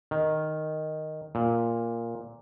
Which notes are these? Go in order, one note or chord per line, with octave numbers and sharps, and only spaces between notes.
D#3
A#2